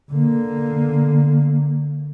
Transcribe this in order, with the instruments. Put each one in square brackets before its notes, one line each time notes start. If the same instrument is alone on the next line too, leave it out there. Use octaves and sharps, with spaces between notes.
[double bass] D3 A#3